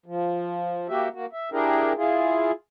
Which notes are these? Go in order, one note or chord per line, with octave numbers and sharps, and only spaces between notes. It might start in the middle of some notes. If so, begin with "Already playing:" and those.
F3
A#3 F#4 G4 E5
A#3 F#4
E5
D4 E4 G4 G#4 A#4
E4 F4 G#4